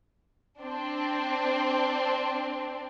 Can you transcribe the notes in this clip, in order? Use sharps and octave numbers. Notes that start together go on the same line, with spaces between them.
C4 D4